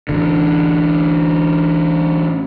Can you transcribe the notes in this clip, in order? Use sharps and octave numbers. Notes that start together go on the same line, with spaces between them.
A1 D3